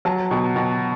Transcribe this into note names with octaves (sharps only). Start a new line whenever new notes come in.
F#3 A5
B2
B2